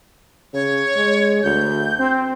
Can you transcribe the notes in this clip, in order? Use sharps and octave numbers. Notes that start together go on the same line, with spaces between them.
C#3 C#5
G#3
D2 G6
C4